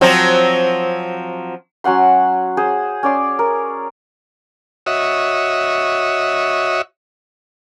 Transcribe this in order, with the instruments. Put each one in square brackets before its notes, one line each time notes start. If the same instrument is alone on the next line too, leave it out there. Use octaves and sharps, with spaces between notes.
[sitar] F3 F#3 C4
[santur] F#3 C#4 F#5 C6
G#4 C5
C#4 D5 C6
A#4
[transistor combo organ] F#4 C#5 D#5 E5